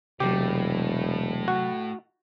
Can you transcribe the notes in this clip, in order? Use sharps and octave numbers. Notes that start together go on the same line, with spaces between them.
E1 A2 C3 F#3 A3 G4
F#4